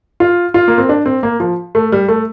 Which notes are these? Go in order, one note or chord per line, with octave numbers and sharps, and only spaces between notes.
F4
F4
A#3
C4
D4
C4
A#3
F3
A3
G3
A3